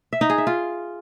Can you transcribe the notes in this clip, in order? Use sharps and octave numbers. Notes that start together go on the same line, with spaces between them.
E5
D#4
G#4
E5
F4